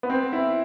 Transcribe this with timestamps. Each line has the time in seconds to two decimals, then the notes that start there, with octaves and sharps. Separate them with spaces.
0.03 B3
0.10 C4
0.33 E4